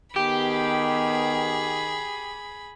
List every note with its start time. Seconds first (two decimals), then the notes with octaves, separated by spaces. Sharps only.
0.16 D#3 B3 G4 G#4 B5